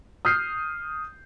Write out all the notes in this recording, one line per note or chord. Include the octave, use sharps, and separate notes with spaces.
D#6 F6 G6 C7